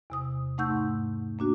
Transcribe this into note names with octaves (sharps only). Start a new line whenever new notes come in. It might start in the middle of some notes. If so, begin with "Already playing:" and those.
E2 C3 D#6
A3 D#4 F#5 C#6 E6 G6
G#2
A#3 D4 F#4